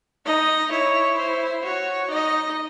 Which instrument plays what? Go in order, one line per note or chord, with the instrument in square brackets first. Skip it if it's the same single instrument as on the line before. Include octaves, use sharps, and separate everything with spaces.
[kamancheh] D#4 [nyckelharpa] D#5
[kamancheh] E4 [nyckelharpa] C#5
[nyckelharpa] C5
[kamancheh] F#4 [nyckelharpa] C#5
[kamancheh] D#4 [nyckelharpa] D#5